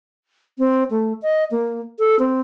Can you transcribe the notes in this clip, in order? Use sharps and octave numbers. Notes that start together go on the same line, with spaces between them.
C4
A3
D#5
A#3
A4
C4